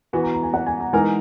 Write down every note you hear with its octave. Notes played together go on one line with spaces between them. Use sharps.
E3 B3 F#4 G#5
A#5
A#5
G#5
F#5
G#5
A#5
E3 G#3 D#4 A#4 G#5